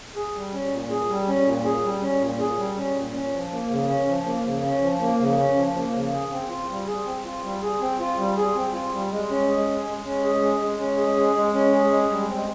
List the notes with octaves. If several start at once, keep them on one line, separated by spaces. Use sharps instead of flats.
G#4
G3
C#4
A#2
G#4
G3
C#4
A#2
G#4
G3
C#4
A#2
G#4
G3
C#4
A#2
C#4
F3
A#3
C#3
C#4
F3
A#3
C#3
C#4
F3
A#3
C#3
C#4
F3
A#3
C#3
G#4
C4
F4
G3
G#4
C4
F4
G3
G#4
C4
F4
G3
G#4
C4
F4
G3
G#3
C#4
G#4
G#3
G#3
C#4
G#4
G#3
G#3
C#4
G#4
G#3
G#3
C#4
G#4
G#3
G3
C4